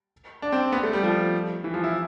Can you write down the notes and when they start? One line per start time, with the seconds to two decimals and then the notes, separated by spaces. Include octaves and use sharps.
0.42 D4
0.52 C4
0.72 B3
0.83 A3
0.93 G3
1.03 F3
1.64 E3
1.74 F3
1.84 E4